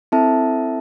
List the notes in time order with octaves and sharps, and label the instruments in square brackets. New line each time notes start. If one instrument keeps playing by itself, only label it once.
[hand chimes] C4 E4 A4 E5 A5